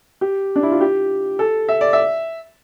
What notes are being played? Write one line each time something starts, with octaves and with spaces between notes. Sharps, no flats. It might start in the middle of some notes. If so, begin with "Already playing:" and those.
G4
D4
E4
F4
G4
A4
E5
D5
E5